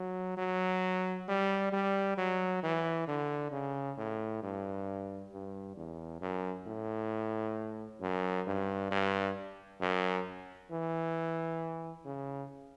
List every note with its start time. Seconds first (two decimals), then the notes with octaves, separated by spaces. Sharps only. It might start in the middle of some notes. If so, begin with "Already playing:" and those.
Already playing: F#3
0.37 F#3
1.28 G3
1.73 G3
2.18 F#3
2.63 E3
3.08 D3
3.52 C#3
3.98 A2
4.43 G2
5.32 G2
5.77 E2
6.21 F#2
6.66 A2
8.01 F#2
8.47 G2
8.91 G2
9.81 F#2
10.71 E3
12.05 C#3